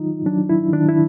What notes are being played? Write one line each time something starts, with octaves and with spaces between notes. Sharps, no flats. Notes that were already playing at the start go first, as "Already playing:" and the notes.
Already playing: D#3 F#3 D#4 F4
F#3 D4
E4
D#3 D4
E4